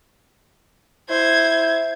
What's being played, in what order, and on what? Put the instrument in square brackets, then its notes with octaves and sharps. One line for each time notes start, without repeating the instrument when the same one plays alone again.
[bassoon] E4 [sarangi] C5 [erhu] G#6